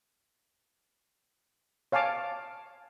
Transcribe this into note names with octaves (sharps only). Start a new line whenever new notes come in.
C#5 F5 G#5 A5 D6